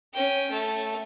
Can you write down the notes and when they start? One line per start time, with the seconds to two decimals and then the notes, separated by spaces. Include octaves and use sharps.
0.13 C#4 G5
0.51 A3